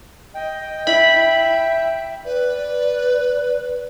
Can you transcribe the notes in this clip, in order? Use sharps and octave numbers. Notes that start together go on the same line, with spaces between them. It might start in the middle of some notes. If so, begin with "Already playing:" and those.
D#5 G5
E4 E5 B5
B4 D5